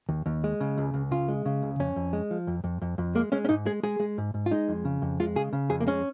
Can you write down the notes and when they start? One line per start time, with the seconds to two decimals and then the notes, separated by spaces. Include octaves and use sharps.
0.09 D#2
0.26 D#2
0.44 G#3
0.60 C#3
0.78 C#2
0.94 C#2
1.11 C#3 F4
1.28 G#3
1.46 C#3
1.63 C#2
1.80 F2 C#4
1.96 F2
2.13 G#3
2.31 F3
2.47 F2
2.64 F2
2.82 F2
2.98 F2
3.15 G#3 A#3
3.32 G#3 C#4
3.45 C#4
3.49 G#2 D#4
3.66 G#3 G#4
3.83 G#3 G#4
4.00 G#3
4.18 G#2
4.34 G#2
4.46 F4
4.51 G#3 D#4
4.68 F2
4.85 C#3
5.02 F2
5.20 G#3 F4
5.36 C#3 G#4
5.53 C#3
5.70 F2 G#4
5.80 A#3
5.87 G#3 C#4